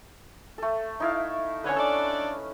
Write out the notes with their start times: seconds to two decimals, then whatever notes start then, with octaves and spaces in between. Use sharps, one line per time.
0.58 A3 A4
1.00 D#4 E4 F5
1.64 D3 C#4 B4 C#5
1.77 D4 A4 D5